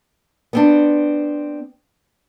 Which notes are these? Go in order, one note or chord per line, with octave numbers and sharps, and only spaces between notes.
B3 C4 D4